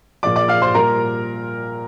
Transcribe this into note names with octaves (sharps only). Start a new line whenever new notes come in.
A#2 F3 D5 D6
D5 D6
F5 F6
C5 C6
A#2 G3 A#4 A#5